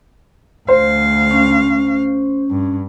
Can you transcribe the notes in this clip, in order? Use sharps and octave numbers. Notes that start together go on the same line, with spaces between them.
D2 C5 F5
C#4
G2